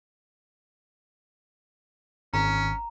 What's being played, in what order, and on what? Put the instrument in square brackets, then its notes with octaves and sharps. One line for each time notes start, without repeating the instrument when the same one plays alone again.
[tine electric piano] G#1 [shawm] C#4 [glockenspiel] A#5